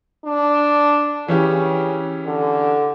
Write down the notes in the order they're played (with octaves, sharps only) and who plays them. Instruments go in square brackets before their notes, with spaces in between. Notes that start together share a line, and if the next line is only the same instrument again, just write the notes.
[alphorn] D4
[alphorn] C#3 [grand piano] E3 C#4 G4
[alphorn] D3